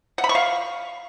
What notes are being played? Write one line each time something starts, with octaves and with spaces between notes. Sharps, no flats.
F#5
B5
C#6
F5